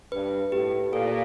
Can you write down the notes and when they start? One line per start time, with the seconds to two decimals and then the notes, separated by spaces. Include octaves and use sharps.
0.12 G2 B4
0.52 A2 G4
0.93 A#2 A4